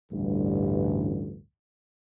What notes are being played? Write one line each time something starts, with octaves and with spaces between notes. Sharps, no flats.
A1 D2 G2